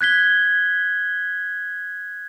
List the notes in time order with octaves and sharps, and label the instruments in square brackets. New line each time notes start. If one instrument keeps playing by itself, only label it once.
[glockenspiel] F#6 G#6 B6 G7